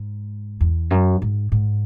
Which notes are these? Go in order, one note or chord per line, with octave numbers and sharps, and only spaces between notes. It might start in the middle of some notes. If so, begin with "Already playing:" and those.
Already playing: G#2
E2
F#2
G#2
G#2